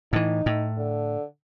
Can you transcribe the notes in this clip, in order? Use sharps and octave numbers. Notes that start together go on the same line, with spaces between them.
A2 E3 D#4
A2
D3